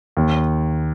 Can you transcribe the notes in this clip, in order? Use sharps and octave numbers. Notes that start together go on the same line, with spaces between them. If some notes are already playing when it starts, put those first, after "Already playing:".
D#2